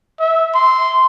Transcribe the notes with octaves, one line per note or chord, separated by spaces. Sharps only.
E5
C6